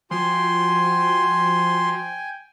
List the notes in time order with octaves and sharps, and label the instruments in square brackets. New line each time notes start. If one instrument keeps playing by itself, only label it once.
[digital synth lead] F3 [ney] F#4 [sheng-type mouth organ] G5 G#5 [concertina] C6